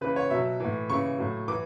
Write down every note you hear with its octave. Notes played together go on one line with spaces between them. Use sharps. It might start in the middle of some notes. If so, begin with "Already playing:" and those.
C#3 E3 B4
C#5
B2 F#3 E5
A2 E3
C#3 E3 C#6
A2 F#3
E3 D6